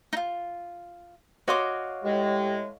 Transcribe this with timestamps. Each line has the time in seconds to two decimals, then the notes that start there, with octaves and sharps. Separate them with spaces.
0.13 D#4 F4
1.48 F#4 C#5 D#5 F5 C6 D6
2.04 A2 G#3 G4